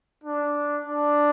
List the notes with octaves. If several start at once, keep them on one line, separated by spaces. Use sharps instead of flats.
D4
D4